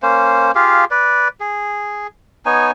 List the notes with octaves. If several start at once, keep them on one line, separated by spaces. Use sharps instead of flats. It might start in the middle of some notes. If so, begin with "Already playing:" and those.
A#3 C#4 C5
F4 G4 G#4 F5
B4 D5
G#4
B3 D#4 C#5 G#5